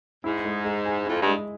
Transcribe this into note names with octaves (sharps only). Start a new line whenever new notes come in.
G#2 E4
G#3
G#3
G#4
F2 E4
G2 G#3